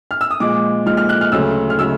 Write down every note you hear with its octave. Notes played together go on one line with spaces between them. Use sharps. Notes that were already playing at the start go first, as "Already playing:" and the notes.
F6
E6
D#6
A#2 F3 G#3 D6
A#2 F3 G#3 F6
F6
F#6
F6
D2 C#3 F#3 A3 E6
F6
C#3 F#3 A3 E6